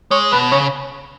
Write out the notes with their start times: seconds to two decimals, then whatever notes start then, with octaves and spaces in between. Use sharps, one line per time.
0.11 G#3 C#5
0.32 B2 B4
0.51 C#3 C#5